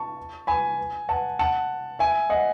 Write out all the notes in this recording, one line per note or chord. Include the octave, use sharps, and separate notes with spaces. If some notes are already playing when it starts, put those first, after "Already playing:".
Already playing: A5 C#6
G#5 B5
F#5 A5
F#5 A5
E5 G#5
D#5 F#5